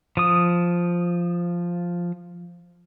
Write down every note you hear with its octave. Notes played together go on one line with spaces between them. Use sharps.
F3 D#6